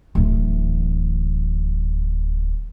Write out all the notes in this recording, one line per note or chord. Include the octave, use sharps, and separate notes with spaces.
D1 E3